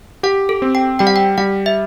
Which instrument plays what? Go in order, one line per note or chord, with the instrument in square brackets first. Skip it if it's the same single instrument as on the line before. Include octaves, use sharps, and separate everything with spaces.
[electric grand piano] G4 [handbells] F#5
[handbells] A4
[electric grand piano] C4
[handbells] G5
[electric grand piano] G3 [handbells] G5
[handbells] F#5
G5
[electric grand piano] G3 [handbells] F#5
[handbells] E5